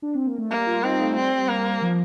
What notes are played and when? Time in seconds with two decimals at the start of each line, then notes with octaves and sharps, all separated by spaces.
0.02 D4
0.15 C4
0.26 A#3
0.38 A3
0.50 G3 A#3
0.67 F4
0.83 C4 D#4
0.99 A3
1.11 A3
1.16 G3 C4
1.49 A#3
1.82 F3